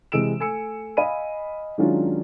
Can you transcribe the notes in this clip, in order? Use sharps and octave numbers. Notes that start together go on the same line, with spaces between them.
C3 E3 G#3 E6 D7 E7
A3 G#5 E6 C#7
D#5 F5 G#5 B5 D#7
D#3 F#3 G#3 C#4 D4 F4